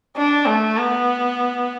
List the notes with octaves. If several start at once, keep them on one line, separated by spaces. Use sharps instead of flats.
D4
A3
B3